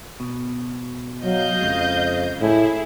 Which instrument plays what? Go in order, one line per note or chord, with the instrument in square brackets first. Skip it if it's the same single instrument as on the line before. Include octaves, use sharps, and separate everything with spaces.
[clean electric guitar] B2
[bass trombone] F#3 [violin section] D#5 F5 G6
[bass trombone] F2 [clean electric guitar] C#3 G#3
[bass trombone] A2 [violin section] E4 G#4